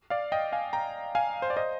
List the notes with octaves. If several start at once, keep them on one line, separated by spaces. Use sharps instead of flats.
D5 F5
D#5 G5
F5 G#5
G5 A#5
F5 G#5
C5
D5
C5 D#5